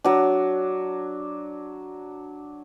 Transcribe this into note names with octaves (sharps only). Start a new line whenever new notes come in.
F#3 D4